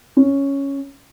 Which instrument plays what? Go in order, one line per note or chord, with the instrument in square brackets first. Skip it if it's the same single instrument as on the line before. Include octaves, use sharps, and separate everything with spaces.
[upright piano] C#4